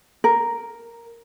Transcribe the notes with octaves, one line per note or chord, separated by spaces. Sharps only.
A#4